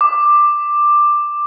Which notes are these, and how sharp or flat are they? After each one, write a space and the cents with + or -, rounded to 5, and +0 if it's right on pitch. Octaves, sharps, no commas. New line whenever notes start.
D6 +10